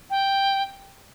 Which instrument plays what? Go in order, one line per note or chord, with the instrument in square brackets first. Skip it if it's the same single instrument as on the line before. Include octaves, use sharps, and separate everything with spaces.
[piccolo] G5